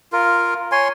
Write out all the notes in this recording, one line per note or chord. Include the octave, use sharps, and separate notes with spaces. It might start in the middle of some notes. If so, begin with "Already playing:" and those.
F4 A#4
C#5 G#5 C6